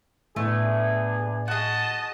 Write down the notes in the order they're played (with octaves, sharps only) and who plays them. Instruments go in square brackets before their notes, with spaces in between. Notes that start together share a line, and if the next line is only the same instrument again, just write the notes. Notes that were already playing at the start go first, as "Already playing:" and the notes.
[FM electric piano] A2 [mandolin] A3 [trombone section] B3 D4 G#4
[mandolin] F#4 G#4 [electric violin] D#5 A5